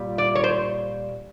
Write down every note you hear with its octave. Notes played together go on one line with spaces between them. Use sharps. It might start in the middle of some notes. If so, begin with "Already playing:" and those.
Already playing: A#2 G3
D5
C#5
C5